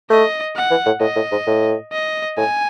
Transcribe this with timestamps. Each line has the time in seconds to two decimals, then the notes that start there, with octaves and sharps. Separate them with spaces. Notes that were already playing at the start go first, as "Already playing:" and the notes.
0.10 A3 D#5
0.56 F#5
0.71 E3
0.86 A2
1.01 A2 D#5
1.16 A2
1.32 G#2
1.47 A2
1.92 D#5
2.37 A2 G#5